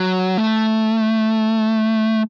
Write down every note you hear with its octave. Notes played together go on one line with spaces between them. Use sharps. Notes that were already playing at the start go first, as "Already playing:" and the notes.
Already playing: F#3
A3